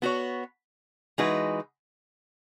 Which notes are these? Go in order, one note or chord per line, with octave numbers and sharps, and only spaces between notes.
B3 F#4 C#5
E3 G#3 D#4 F#4 B4